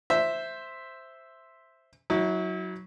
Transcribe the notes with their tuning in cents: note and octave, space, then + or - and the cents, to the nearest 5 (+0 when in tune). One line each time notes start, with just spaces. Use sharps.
C5 +0 E5 +0
F#3 +0 E4 -35